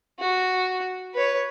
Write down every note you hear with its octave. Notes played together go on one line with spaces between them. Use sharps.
F#4
B4 C#5